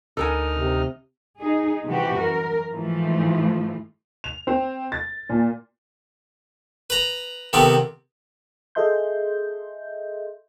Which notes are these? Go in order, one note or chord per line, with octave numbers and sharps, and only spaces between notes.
D2 D#4 A4 A#4 G#5 F6
C3
D#4 G#4
C3 E3 F#4 G4
F#2 A#4
G#2 E3 F3 A3
F7
C4
A6
A#2
B4 A#5
C3 D#3 B3 C4 A4
G#4 A4 D#5 E5 C6 G6